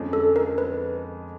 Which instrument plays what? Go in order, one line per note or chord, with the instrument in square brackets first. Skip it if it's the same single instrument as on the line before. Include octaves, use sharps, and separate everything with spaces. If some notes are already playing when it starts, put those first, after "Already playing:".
Already playing: [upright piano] F2 D3 F3 G#3 C#4
[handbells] A4
A#4
B4